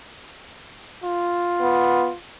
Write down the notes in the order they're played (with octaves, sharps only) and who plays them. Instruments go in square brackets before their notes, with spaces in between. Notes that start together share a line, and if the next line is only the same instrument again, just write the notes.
[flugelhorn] F4
[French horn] B3